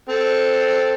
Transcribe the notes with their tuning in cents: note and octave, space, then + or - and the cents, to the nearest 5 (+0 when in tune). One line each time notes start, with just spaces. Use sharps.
C4 +0 A4 +0